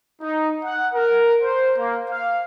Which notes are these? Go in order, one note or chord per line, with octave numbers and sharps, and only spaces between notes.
D#4
F#5
A#4
C5
A#3
F5